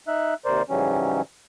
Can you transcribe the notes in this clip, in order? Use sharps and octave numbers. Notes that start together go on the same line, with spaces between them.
D#4 E5 F#6
D#2 C3 A#4 C5 D5
G#2 C#3 E3 F#3 G3 C#4